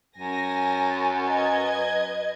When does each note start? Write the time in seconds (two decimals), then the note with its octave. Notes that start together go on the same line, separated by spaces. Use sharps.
0.18 F#2 G#5 A#6
1.25 B4 D#5 G#6